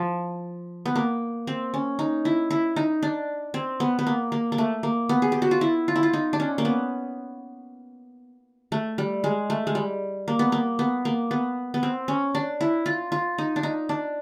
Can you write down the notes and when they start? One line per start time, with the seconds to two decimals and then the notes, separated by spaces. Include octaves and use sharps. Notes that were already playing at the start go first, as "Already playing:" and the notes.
Already playing: F3
0.86 B3
0.96 A#3
1.47 C4
1.74 C#4
1.99 D#4
2.25 E4
2.51 E4
2.76 D#4
3.03 D4
3.54 C4
3.80 B3
3.99 B3
4.07 A#3
4.32 A#3
4.52 A#3
4.58 A3
4.83 A#3
5.09 B3
5.22 G#4
5.32 G4
5.42 F#4
5.51 F4
5.61 E4
5.88 F4
5.96 E4
6.03 F4
6.13 D#4
6.33 D4
6.40 C#4
6.58 A#3
6.65 B3
8.72 A3
8.98 G3
9.24 G#3
9.50 A3
9.67 G#3
9.75 G3
10.28 A#3
10.39 B3
10.52 A#3
10.79 B3
11.05 A#3
11.31 B3
11.74 B3
11.83 C4
12.08 C#4
12.35 D4
12.61 E4
12.86 F4
13.12 F4
13.38 D#4
13.56 D4
13.63 D#4
13.89 D4